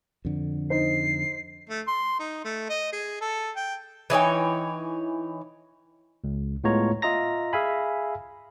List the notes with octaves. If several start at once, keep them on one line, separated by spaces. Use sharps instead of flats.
F2 D3
D#4 C5 C7
A3
C6
D#4
A3
D#5
G#4
A4
G5
E3 D#4 C#5 G5
C#2
A2 G#3 B3 F4 C#5 A#5
F4 D#5 E5 A#5 A#6
G#4 E5 F5 G#5 B5